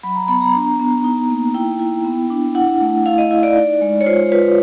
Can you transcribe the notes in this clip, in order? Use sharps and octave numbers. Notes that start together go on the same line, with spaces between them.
F#3 B5
A#5
B3 B5
A#5
D4
B3
D#4
A#3
E4 G5
E4
B3
D4
E4 F#5
A3
E4 F5
D#5
E4
D5
D#4
G#3
C#5
F4 C5
F4 B4